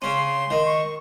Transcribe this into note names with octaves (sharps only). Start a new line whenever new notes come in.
C#3 C#4 C6
D#3
C#6